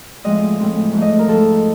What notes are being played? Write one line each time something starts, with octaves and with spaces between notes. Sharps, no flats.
A2 F3 G#3 C4 D#5
A2 F3 G#3 C4
G#2 F3 A3
D#5
A#4
G#2 F3 A3 A4